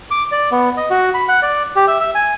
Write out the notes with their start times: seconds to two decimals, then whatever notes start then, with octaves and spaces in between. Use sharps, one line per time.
0.11 D6
0.32 D5
0.52 B3
0.77 D#5
0.90 F#4
1.14 B5
1.28 F#5
1.42 D5
1.76 G4
1.87 E5
2.00 E5
2.15 G#5